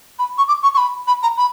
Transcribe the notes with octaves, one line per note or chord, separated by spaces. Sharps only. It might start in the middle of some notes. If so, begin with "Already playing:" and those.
B5
C#6
D6
C#6
C#6
B5
B5
A#5
B5